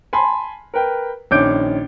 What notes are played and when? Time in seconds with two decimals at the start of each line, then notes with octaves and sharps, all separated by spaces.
0.13 G#5 A5 B5 C6
0.74 A#4 B4 G5
1.31 A#1 D#3 C#4 D6 G6 D7